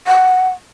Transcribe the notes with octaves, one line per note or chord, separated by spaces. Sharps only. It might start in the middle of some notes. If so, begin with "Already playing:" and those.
F#5